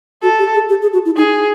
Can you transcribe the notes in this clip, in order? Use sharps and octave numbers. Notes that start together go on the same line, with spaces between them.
F#4 A4
G4
G#4
G4
G#4
F#4
E4
D#4 G#4